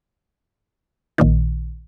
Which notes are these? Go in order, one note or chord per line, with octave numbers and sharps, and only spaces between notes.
A#1 A#2 D#3